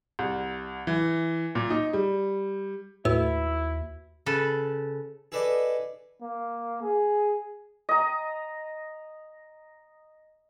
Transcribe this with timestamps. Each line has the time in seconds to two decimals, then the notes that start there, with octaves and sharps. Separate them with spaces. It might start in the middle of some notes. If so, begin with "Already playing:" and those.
0.19 C2
0.87 E3
1.55 A#2
1.70 D#4
1.93 G3
3.05 D#2 A2 E4 F#4 B4 E6
4.26 C#3 A4 B4
5.32 G#4 A4 B4 D5 D#5
6.23 A#3
6.82 G#4
7.89 D#5 A#5